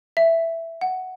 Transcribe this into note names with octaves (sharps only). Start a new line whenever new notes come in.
E5
F#5